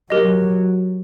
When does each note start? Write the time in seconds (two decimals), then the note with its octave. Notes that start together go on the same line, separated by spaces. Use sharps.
0.10 F#3 G4 A#4 D#5